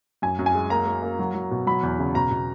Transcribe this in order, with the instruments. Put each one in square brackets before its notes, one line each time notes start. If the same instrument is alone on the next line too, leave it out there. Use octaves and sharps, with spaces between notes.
[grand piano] F#2 G#5
F#2
G#5
G#3
A#3 A#5
A#3
A#3
F#3
F#3
B2
F#3 B5
E2
C#3
B2 A#5
B2